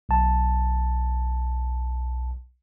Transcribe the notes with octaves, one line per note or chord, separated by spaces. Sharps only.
B1 A5